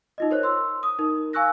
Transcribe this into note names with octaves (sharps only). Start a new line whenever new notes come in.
D#4 F4 D#5
A#4 C5 C#5 F#6
C6 E6
D#6
D#4 A#4
F5 G#5 C#6 E6 F#6 A#6